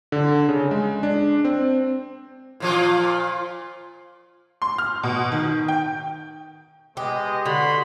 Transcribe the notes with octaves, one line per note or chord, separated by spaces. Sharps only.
D3
C#3
G#3
D4
C4
A#2 F3 F4
C6
F6
B2
D#3
G5
G#3 B3 G4 D#5
D3 F#4 B5 C6